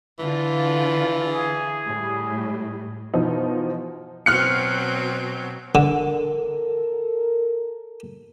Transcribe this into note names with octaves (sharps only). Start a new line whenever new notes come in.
D3 E3 F4
G#4
A2 G3
B2 E3 F3 D#4
B2 F#3 C4 F6 F#6 C#7
D3 A4 A#4